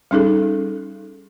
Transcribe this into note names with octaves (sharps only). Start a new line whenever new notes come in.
G3 C#4 D#4 G#4 A4